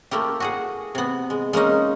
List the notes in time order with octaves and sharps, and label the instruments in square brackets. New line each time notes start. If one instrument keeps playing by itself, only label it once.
[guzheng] A3 A#3 E4 G4
F#4 G#4 F#5
C3 B3
G#3
G#3 A#3 C#4 D#4